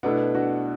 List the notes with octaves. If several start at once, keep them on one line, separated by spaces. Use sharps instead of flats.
B2 A3 B3 D4 E4
D4 F#4